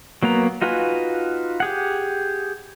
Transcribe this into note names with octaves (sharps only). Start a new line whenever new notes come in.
F#3 A#3 B3 A#5
D#4 F4 F#4 B4 G#5
G4 G#4 F#5